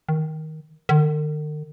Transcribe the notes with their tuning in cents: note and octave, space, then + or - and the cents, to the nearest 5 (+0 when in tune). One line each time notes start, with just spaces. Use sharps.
D#3 +10
D#3 -45